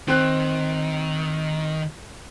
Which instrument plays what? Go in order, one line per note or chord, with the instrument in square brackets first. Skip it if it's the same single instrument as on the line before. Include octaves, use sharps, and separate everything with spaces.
[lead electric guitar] D#3 [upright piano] C4 F#6